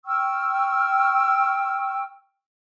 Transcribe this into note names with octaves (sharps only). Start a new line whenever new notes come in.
G5 C#6 E6 F6